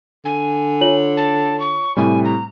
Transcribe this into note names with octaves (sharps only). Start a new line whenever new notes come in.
D3 G#5
F4 C#5 F#7
A5
C#6
A2 C3 G3 G#5
A#5